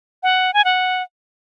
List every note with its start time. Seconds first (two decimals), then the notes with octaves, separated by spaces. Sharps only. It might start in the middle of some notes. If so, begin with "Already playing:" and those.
0.23 F#5
0.54 G#5
0.65 F#5